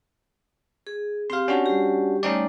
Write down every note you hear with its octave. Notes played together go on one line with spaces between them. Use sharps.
G#4
C4 G4 F5 C6
C#4 D4 F#4
G3 G4
G3 A3 C#4 D#4 D5